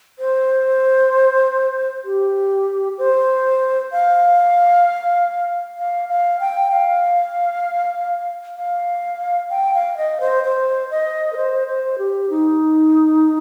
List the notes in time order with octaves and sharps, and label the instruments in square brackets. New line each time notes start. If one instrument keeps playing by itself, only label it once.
[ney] C5
G4
C5
F5
F5
F5
G5
F5
F5
G5
F5
D#5
C5
C5
D#5
A#4
C5
C5
G4
D#4